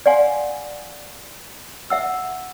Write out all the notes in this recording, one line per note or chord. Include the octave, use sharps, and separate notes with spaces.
D5 F5 F#5 G#5 C6
E5 F#5 E6